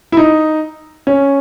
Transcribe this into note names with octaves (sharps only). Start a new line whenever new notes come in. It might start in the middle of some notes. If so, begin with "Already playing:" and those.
E4
D#4
C#4